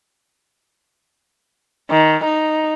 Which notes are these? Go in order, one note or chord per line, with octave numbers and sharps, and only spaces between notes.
D#3
D#4